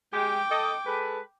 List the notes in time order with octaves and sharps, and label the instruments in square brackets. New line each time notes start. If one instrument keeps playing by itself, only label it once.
[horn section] G#3 G4 [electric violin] G5 D6
[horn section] A4 D#5
G#3 A4 B4